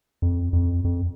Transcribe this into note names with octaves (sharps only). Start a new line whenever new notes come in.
F2
F2
F2